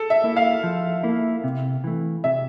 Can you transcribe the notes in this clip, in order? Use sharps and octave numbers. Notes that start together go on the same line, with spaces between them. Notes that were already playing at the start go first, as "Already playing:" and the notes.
Already playing: A4
E5
A#3 E4
F5
F3
A#3 E4
C3
E3 A3
C3 E5